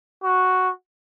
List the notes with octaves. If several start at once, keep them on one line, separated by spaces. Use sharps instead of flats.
F#4